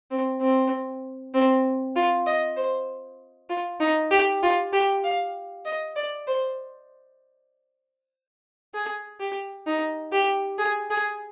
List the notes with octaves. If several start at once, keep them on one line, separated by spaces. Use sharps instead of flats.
C4
C4
C4
F4
D#5
C5
F4
D#4
G4
F4
G4
F5
D#5
D5
C5
G#4
G4
D#4
G4
G#4
G#4